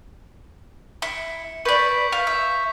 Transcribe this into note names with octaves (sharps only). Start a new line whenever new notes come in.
E4 C#7
B4 D5 C#6 G6 B6
F5
E5